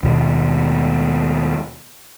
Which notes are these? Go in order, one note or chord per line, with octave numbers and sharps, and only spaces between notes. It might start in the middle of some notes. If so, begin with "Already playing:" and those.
D#2 B2 B3